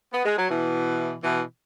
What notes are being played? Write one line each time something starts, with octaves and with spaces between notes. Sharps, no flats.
B3
G#3
F#3
B2 E3
B2 E3